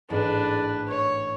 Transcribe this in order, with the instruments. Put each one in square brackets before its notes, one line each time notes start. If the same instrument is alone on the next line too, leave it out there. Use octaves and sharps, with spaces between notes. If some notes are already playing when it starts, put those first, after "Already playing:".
[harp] A1 G#2 [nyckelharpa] D4 B4
[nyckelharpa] C#5